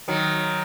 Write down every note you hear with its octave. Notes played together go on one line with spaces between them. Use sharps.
D#3 F#3